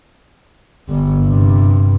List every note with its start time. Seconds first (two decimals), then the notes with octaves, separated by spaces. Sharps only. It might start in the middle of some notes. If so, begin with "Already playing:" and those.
0.89 G1 G2
1.26 G2 C3